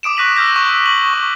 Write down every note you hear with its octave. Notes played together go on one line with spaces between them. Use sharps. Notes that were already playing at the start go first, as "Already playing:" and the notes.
D6 D#6 D7 E7
C#6 F#6 A#6 B6 D#7 F#7
E6 F6 G6 A#6
C#6 E6
F#7
C#6